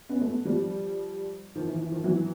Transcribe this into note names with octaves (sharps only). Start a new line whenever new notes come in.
B3 C#4
A3 B3
F3 G3
D#3 F3
E3
E3
D#3 F3
E3 F#3